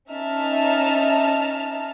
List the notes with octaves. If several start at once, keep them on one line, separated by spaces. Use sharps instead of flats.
C#4 D#4 E5 A5 F6